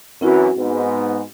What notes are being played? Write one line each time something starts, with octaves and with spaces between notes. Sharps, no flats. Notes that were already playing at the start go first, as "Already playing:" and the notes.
F#2 E3 C4 E4 F#4
G#2 B3